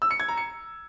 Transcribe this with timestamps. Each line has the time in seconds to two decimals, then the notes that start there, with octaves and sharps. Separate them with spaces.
0.02 E6
0.11 C#7
0.20 G#6
0.28 A#5
0.37 C#7